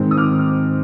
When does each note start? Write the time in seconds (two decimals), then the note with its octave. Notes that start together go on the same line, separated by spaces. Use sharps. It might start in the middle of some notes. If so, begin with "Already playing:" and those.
Already playing: G#2 D#3 G#3 C4
0.11 D#6
0.17 D6 F6